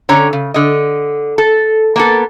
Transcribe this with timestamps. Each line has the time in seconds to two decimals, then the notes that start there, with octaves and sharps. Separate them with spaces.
0.09 D3 C#4 C#5 A#5
0.33 C#3
0.54 D3 D#5
1.38 A4
1.96 A#3 B3 A4